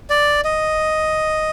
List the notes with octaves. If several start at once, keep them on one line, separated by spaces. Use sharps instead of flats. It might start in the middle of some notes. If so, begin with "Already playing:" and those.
D5
D#5